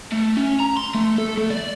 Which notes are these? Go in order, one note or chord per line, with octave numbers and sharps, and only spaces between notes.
A3
C#4
A#5
C6
A3
A4
A3
D5